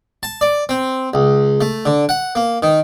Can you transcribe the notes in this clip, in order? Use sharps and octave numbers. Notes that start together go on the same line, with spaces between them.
A5
D5
C4
C#2
A3
D3
F#5
A#3
D#3